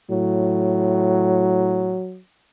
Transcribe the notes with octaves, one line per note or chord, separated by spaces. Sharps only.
A2 F#3